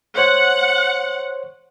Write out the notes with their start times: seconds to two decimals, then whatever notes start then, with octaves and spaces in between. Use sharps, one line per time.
0.17 C5 C#5 F#5